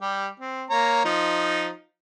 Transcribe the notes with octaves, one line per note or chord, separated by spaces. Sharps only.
G3 G4
C4
A#3 C#5 A#5
F3 D#4